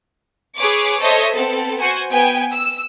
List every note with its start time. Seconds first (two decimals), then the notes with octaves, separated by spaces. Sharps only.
0.56 G#4 B4 C#5 D6
0.99 A4 C5 C#5 D#5 E5
1.33 B3 C4 A4
1.78 F#4 C5 G#5 C#7
2.10 B3 G5 G#5
2.51 E6